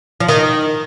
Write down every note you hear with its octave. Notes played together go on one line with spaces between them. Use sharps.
F3
D#3